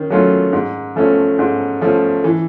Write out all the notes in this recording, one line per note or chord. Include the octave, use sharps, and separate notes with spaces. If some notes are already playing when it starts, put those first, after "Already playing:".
Already playing: D#3 C#4
F#3 A3 C#4 F4
G#2
F3 A3 C#4
G#2
F3 A3 C#4
E3